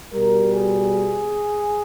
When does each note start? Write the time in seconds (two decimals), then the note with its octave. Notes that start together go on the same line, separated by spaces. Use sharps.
0.13 B2 G3 A#4
0.53 G#4